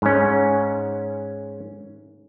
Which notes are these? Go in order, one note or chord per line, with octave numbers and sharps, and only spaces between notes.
G#2 C#4